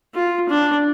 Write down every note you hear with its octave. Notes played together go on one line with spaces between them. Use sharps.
F4
D4